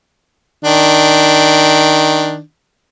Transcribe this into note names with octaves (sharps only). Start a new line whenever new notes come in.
D#3 D4